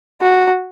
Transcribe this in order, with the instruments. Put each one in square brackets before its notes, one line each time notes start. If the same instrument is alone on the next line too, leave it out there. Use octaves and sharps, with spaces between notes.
[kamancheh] F#4